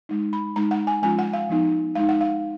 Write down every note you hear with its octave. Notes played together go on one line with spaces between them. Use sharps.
G#3 D#4
B5
G#3 D#4 A#5
F#5
G#5
F3 G#3 C#4 F4 G#5
F#5
F5
F3 B3 D#4
G#3 D#4 F5
F#5
F5